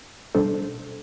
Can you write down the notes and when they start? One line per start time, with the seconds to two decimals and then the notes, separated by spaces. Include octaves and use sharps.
0.35 B2 G3 D4 A4 C5